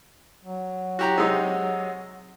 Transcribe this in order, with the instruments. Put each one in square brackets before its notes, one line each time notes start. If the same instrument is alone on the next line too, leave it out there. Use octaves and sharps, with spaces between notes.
[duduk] F#3
[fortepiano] F#4 G4 A#5
C3 G#3 D#4